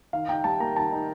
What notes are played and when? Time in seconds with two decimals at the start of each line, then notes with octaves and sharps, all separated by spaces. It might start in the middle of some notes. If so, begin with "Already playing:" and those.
0.13 D#3 F5
0.29 D#4 G5
0.44 G3 A5
0.60 A#3 A#5
0.76 D#3 A5
0.92 D#4